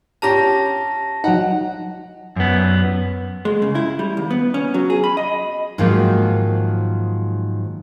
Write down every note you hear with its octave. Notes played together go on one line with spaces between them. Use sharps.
C#4 G4 A5 A#5 A#6
F#3 D#4 F#5
F#2 B3
G#3
C#3
E4
G3
D#2
B3
C#4
F#3
G#4
B5
D#5
G#2 D#3 F3 F#3 A#3 F4